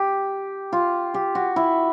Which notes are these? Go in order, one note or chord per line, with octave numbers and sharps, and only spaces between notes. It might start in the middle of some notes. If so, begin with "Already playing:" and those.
Already playing: G4
F4
G4
F#4
E4